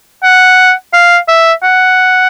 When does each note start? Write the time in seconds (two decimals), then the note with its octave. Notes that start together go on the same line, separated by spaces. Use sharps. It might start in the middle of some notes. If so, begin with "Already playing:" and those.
0.24 F#5
0.93 F5
1.28 E5
1.63 F#5